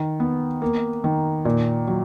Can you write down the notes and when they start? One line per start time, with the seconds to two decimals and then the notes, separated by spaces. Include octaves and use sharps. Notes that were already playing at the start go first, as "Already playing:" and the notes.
Already playing: D#3
0.20 B3
0.62 A#3
1.04 D#3
1.45 A#2
1.87 F#3